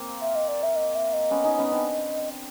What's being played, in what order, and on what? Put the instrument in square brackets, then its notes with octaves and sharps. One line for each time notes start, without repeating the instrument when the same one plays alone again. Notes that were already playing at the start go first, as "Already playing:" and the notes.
Already playing: [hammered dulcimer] A#3 C4
[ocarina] E5
D#5
D5
E5
D#5
E5
D#5
[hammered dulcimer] B3 C#4
C#4 D#4
B3 C#4
C4 D4